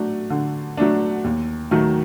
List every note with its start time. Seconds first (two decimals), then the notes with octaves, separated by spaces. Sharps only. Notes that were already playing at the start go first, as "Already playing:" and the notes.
Already playing: F#3 A3 D4
0.30 D3
0.77 F#3 A3 D4
1.24 D#2
1.71 D#3 F#3 A3